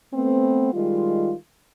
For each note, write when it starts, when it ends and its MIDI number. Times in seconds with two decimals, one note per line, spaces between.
0.14 0.71 57
0.14 0.71 59
0.14 0.71 60
0.73 1.33 51
0.73 1.33 55
0.73 1.33 56
0.73 1.33 65